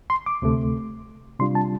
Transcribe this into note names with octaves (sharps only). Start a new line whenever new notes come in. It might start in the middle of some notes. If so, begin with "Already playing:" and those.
C6
D6
D2 C3 A3
C3 G3 D4 F4 C6
A5